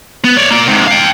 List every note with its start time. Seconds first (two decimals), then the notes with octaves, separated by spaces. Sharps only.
0.25 B3
0.37 C#5 D5
0.50 A#3 D5
0.67 G#2 C3
0.87 F5 G5